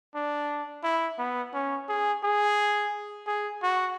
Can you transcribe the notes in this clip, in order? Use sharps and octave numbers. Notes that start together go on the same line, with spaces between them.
D4
E4
B3
C#4
G#4
G#4
G#4
F#4